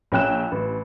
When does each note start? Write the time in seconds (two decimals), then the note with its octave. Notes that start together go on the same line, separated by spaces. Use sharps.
0.12 A#1 C#4 G5 F#6 E7
0.52 A1